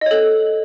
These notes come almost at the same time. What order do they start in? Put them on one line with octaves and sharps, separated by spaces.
D#5 C#5 A4